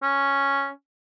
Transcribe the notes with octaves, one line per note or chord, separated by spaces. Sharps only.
C#4